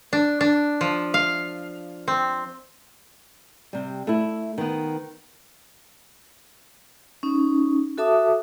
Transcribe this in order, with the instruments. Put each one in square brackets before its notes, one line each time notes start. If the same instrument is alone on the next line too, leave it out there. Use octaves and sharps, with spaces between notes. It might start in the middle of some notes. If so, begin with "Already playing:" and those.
[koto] D4
D4
F3
F5
C4
[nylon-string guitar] C3 G3
A3 E4
D#3 B3
[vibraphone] C#4 D#4
F#4 A4 E5 A5 D6 D#6